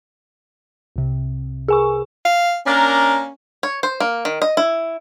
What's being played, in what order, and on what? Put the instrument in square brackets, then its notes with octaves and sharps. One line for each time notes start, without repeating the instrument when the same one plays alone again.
[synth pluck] C2 C3
[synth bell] G#4 G#5 C#6 [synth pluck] A#4
[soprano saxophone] F5
[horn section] A#3 D4 A#4 [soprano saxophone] C#4
[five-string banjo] C#5
C5
A#3
D#3
D#5
E4